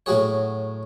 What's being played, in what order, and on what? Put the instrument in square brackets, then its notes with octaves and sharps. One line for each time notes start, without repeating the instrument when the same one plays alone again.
[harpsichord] A2 F#3 F#4 G#4 C#5